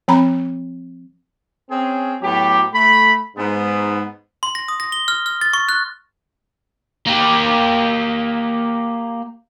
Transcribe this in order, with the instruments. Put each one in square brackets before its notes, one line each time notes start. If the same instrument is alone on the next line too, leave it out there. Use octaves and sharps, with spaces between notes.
[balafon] F3 C4 A#5 B5
[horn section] C4 C#4 G#4
A2 F#3 B3 G4
A3 B5
G#2 B3
[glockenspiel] C6
A#6
D#6
A#6
G7
F6
F6
A6
C#6
F#6
[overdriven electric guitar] A#3 G4